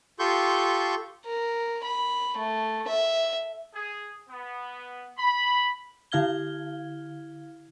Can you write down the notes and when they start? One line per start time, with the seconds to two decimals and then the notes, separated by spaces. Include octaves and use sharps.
0.19 F4 G4 A4 C6 C#6 G6
1.25 A#4
1.84 B5
2.37 A3
2.88 E5
3.74 G#4
4.28 B3
5.17 B5
6.12 D3 E4 F5 F6 G#6 G7